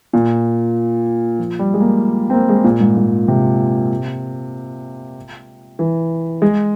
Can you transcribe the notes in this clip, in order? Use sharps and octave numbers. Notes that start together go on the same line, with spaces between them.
A#2
F3
G3
G#3
A#3
C4
A#3
G#3
A#2
G#2
G#2
C3
E3
G#3